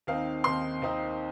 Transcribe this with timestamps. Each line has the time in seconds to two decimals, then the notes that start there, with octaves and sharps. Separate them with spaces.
0.07 D#2 D#3 C4 D#4 F5
0.44 D#2 D#3 C4 D#4 C6
0.82 D#2 D#3 C4 D#4